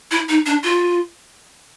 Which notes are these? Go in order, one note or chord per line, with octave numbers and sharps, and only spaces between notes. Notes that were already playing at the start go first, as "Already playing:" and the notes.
E4
D#4
D4
F4